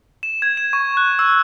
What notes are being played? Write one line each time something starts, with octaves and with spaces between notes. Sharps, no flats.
E7
G#6
E7
C#6
F#6
E6